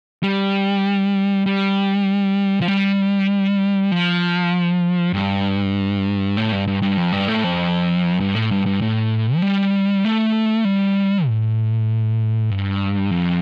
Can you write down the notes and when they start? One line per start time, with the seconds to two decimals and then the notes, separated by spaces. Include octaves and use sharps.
0.23 G3
1.46 G3
2.61 F3
2.68 G3
3.91 F3
5.13 G2
6.37 A2
6.52 G2
6.67 G2
6.82 G2
6.97 F2
7.12 G2
7.28 A2
7.44 F2
8.20 G2
8.35 A2
8.51 G2
8.66 G2
8.82 A2
9.36 F3
9.42 G3
10.05 A3
10.65 G3
11.27 A2
12.50 G2
13.11 F2